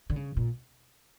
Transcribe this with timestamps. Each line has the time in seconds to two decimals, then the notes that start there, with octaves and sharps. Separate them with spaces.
0.10 D3
0.16 C#3
0.37 A#2